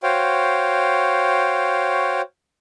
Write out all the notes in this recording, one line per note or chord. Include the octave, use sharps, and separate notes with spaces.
F#4 C5 C#5 F5 G5